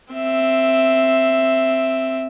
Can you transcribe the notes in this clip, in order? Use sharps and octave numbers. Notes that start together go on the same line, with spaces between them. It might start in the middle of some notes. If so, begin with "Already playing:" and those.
C4 E5